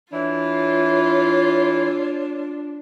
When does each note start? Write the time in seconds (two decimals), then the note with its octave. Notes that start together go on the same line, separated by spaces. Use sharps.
0.12 E3 D4 E4 F4 C#5